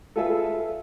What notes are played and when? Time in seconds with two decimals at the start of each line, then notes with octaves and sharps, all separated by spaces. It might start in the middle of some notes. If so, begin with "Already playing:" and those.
0.16 F4 G#4 A4 B4 E5